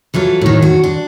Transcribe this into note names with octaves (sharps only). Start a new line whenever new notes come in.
E3 F#3 F4 A4
A2 D#3
F#4
D4